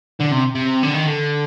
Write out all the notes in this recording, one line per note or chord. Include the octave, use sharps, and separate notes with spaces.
D3
C3
C3
D3
D#3
D3